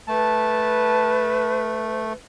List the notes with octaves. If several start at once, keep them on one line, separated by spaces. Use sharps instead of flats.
A3 B4 A5